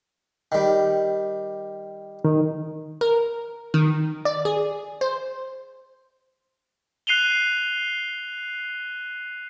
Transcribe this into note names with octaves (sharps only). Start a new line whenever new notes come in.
D#3 G3
D#3
A#4
D#3
D5
G#4
C5
F#6 C7 D#7 F7 G7